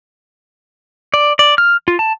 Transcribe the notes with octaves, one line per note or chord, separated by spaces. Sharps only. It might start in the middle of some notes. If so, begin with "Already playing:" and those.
D5
D5
F6
F4
A5